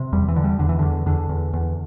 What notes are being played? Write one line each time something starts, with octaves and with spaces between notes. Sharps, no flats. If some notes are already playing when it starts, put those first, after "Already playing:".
Already playing: C3
E2 G3
E3
D3
G3
E2 D3
E3
E2 D3
E2 D3
E2
E2